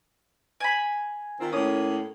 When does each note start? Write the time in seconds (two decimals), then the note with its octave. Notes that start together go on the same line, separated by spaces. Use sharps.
0.60 G#5 B5
1.40 D#3 C4 F4
1.53 A2 A#3 C#4 D#6